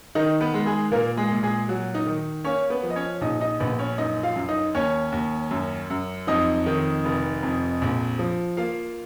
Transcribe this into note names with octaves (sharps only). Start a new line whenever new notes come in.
D#3 D#4 D#5
B3 B4
G#3
G#3 G#4
A#2 A#3 A#4
G#3 G#4
A#2
G#3 G#4
F#3 F#4
D#4
D#3
A#3 C#4 C#5
B3 B4
F3
D#5
C#4 C#5
A#1 D#4 D#5
D#4 D#5
A#1 B3 B4
C#4 C#5
F#2 D#4 D#5
F4 F5
F#2
D#4 D#5
D#2 C#4 C#5
D#2
F#2
F#2
F2 D#4 D#5
D#3
F1
F2
A#1
F3
A#3 F4 F5